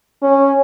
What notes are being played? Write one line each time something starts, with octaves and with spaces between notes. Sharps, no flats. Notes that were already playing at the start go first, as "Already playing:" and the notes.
C#4